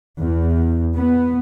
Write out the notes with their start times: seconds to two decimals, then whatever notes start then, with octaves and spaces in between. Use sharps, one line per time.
0.19 E2
0.97 B3